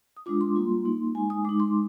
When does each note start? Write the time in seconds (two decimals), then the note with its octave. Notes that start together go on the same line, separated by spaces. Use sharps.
0.17 D#6
0.26 G#3 D4 F4 D6
0.41 C6
0.56 G3 A#3 F4
0.85 A#3 D#4
1.15 G#3 D#4 G#5
1.30 D#6
1.45 G#3 D#4 D6
1.60 C6